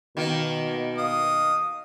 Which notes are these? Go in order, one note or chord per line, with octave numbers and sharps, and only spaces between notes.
B2 D#3 A#3
F5 D#6